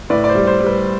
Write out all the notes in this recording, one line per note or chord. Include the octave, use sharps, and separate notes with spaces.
A2 B4 D5
D5
C5
G3
C5
G3
B4